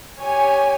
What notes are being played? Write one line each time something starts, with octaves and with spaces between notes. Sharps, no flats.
G4 C#5 G#5